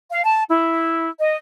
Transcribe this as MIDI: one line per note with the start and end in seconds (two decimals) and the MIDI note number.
0.11 0.22 77
0.24 0.42 81
0.50 1.08 64
1.19 1.37 75